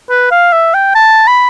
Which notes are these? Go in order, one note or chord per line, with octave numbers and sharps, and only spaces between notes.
B4
F5
E5
G5
A5
B5